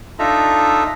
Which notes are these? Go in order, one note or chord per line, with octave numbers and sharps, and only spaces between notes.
D4 D#4 F4 A4 E5 A#5